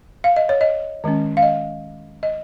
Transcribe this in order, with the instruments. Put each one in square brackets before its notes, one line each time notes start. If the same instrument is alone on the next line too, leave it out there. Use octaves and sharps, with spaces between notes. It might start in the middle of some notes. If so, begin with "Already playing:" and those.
[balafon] F5
D#5
C#5
D#5
D#3 G#3 C#4
F5
D#5
D#5